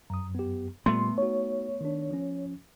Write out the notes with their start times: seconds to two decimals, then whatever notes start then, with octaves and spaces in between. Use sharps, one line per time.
0.10 F#2 A#5 D#6
0.35 B3 G4
0.86 A#2 G3 A3 B3 C6
1.18 D#4 F#4 C#5
1.81 D#3 D4
2.11 F3 C#4